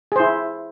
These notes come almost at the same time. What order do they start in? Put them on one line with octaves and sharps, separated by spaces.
G#4 C5 E4